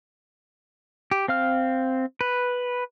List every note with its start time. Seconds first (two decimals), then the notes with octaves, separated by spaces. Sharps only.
1.11 G4
1.28 C4 F5 F6
2.21 B4